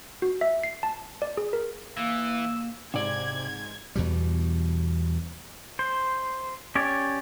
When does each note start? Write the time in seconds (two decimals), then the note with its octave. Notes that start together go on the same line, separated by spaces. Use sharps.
0.22 F#4
0.41 E5
0.63 C7
0.83 A5
1.22 D5
1.37 G#4
1.53 A#4
1.97 E3 A#3 F5 E6
2.94 G#2 C3 D5 G#6
3.96 E2 B2 G3
5.79 C5
6.75 C#4 G4 C#5 D5